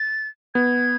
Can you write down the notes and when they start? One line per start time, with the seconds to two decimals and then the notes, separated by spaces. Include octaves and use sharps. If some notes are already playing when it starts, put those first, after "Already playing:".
Already playing: A6
0.54 B3 G#6